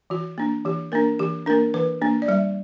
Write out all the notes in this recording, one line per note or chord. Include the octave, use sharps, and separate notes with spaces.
E3 F#4
A#3 D4
E3 G4
A#3 D4 A#4
E3 G4
A#3 D4 A#4
E3 B4
A#3 D4
D5
G3 E5